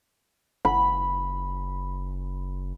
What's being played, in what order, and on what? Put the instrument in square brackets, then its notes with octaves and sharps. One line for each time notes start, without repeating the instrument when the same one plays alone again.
[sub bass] F#1 [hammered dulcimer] B5